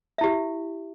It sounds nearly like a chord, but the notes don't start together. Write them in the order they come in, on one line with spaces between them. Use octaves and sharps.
E5 E4 G4